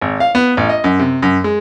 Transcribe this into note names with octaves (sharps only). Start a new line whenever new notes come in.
G#1
F5
B3
A1
D#5
F#2
C3
F#2
G#3